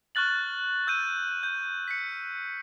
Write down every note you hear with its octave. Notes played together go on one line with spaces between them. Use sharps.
C#6 F6 F#6 A6 F#7
E6 G6 A6 D#7
G6
B6 C#7